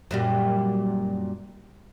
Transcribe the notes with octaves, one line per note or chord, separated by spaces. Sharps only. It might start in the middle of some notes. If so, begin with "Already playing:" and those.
F#2 A#2 G3